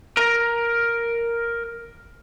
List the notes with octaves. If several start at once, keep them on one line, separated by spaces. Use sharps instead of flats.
A#4 A#5